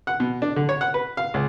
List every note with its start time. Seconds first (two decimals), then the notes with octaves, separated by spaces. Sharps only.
0.07 F#5
0.20 B2
0.42 D4
0.56 D3
0.69 C#5
0.81 F#5
0.94 B4
1.17 F5
1.34 C#2